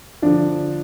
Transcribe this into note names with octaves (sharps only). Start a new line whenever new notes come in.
D3 F3 D4